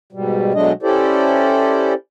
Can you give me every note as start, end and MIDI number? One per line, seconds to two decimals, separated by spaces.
0.13 0.53 44
0.13 0.53 47
0.13 0.53 55
0.54 0.72 47
0.54 0.72 54
0.54 0.72 56
0.54 0.72 57
0.54 0.72 62
0.54 0.72 75
0.83 1.94 61
0.83 1.94 64
0.83 1.94 67
0.83 1.94 69
0.83 1.94 72
0.83 1.94 74